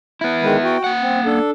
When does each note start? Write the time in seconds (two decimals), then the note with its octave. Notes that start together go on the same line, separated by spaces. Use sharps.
0.21 B3 E4
0.42 D#3 G#3 B4
0.64 F#4 G5
0.84 A#3 F#5
1.02 C4
1.26 D4 A4